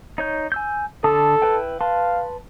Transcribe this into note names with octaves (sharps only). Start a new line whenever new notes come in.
D#4 C#5 G6
G#5 E6 G6
D3 A4 A5 D#6
E4 B4 G5
B4 F5 A5 C6